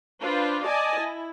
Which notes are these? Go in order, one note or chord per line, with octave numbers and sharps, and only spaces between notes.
D4 F4 B4 C5
D5 D#5 G#5 A5
E4